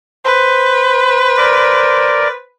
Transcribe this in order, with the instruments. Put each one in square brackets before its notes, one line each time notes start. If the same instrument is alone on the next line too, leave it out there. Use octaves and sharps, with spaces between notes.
[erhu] B4 [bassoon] C5
[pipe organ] A#4 D5